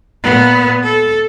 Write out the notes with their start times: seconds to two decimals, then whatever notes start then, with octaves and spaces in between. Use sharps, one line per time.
0.23 A#2 B3
0.83 A4